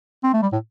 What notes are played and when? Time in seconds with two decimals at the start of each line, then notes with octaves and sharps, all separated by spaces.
0.23 C4
0.33 A3
0.42 G3
0.53 A2